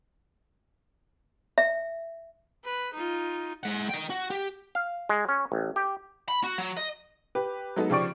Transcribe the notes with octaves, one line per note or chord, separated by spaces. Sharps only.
E5
B4
D#4 F4
G#3 F#5
D#5 G5
F#4
G4
F5
G#3
C#4
A1
G4
B5
F#4
F#3
D#5
G4 B4
F#3 G#3 B3 D#4 A4
C#3 F3 G4 D5 C#6 D7